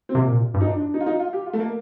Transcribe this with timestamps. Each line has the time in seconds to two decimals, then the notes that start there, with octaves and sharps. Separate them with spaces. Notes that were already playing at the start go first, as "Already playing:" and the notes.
0.09 C4
0.15 C3 A#3
0.28 A#2
0.54 G2
0.61 D#4
0.67 D4
0.80 D4
0.94 D#4
1.00 F4
1.06 D#4
1.20 F4
1.33 G4
1.46 F4
1.53 A3
1.60 A#3